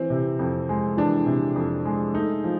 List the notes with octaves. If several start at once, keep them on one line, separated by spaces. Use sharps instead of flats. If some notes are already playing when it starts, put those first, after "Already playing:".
Already playing: E3 C4
C3
F2
G#3
E3 D4
C3
F2
G#3
A3 D#4
F3